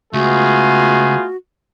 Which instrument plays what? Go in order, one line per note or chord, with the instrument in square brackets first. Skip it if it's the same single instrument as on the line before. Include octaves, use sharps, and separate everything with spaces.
[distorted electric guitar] C#2 [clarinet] A3 [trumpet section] B3 F4 G#4 [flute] F#4